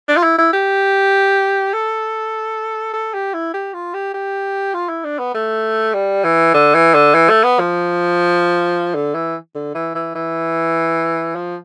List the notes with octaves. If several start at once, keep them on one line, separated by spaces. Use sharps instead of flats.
D4
F4
E4
E4
G4
A4
A4
G4
E4
G4
F4
G4
G4
F4
E4
D4
B3
A3
G3
E3
D3
E3
D3
E3
A3
B3
F3
D3
E3
D3
E3
E3
E3
F3